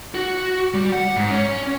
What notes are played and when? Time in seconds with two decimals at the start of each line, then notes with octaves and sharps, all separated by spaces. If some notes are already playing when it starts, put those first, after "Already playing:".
0.15 F#4
0.74 G3
0.92 F#5
1.16 G#2
1.31 C#4